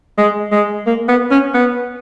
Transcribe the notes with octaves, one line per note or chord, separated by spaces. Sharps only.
G#3
G#3
A#3
B3
C#4
B3